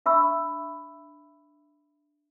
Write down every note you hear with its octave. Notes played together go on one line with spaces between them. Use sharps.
D4 E5 B5 C#6 E6